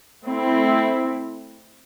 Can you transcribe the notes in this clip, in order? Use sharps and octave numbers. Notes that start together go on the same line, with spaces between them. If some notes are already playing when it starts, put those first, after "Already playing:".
A3 C4 E4